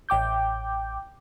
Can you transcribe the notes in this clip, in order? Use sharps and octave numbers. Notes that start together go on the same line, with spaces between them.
A1 G5 D6 G6